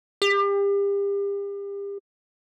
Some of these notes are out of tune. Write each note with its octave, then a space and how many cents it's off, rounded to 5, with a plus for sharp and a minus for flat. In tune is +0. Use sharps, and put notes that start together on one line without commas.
G4 +35